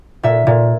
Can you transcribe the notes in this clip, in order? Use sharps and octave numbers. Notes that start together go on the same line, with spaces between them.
A#2 E5
A#2